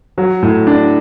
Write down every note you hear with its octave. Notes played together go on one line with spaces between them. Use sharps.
F#3
A2
D4